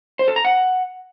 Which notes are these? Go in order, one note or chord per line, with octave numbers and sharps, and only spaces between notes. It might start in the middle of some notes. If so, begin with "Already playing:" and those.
C5
A4
A#5
F#5